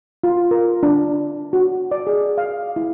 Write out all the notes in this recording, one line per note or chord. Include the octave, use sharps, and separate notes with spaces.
F4
A#4
D4
F#4
D5
G#4
F5
E4